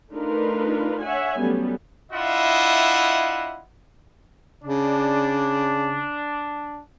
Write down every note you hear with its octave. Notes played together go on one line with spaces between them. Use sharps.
A3 D4 D#4 F4 A#4 B4
C#5 E5 F#5 G#5
F#3 G3 A3 B3 C#4
D4 E4 F4 D#5 E5 F#5
C#3 D4